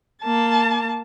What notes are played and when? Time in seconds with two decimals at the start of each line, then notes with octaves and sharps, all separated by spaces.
0.24 A#3 A5